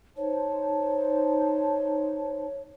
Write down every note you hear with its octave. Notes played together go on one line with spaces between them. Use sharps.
D#4 C5 C#5 A5